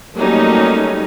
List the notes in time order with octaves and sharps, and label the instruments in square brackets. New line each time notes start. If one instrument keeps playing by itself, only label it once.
[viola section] F#3 G3 A3 A#3 C#4 D#4